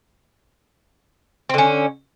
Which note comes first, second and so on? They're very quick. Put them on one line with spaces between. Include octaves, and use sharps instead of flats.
C4 D3 C#4